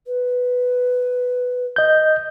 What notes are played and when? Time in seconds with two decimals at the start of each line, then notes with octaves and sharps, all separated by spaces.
0.07 B4
1.76 D#5 G6